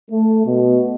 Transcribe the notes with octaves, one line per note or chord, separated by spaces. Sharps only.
A3
B2